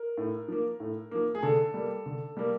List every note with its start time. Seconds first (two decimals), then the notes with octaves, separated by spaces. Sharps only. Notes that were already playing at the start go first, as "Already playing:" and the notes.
Already playing: A#4
0.18 A2
0.48 F3 A#3
0.80 A2
1.11 F3 A#3
1.35 G#4
1.43 D3 A4
1.74 G3 A#3
2.06 D3
2.37 G3 A#3